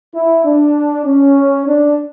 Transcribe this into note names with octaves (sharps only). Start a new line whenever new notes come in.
E4
D4
C#4
D4